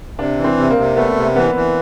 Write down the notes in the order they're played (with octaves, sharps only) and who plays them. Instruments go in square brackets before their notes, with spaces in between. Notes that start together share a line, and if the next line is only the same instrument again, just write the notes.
[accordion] C3 [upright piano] D4
[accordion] E3
[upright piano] C4
[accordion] C3
[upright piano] A#3
[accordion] C3
[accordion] A3 [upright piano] B3
[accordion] C3
[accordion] E3 [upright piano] B3
[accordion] E3